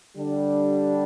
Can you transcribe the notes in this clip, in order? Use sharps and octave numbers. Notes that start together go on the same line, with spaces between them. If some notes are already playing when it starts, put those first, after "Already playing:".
D3 G3 D4